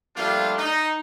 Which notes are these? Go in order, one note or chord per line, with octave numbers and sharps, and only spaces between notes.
F3 G3 A3 A#3 D4 F4
D#4